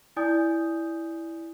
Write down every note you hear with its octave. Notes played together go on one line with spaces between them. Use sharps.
E4 D5 G#5 D#6 G6